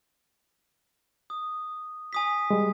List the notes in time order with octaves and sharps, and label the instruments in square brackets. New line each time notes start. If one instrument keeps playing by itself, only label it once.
[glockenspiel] D#6
G#5 D#6 B6
[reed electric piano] G3 G#3